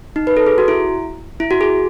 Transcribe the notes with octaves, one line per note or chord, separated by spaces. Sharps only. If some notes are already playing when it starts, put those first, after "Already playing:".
D#4
B4
A4
G#4
F#4
E4
E4
F#4
G#4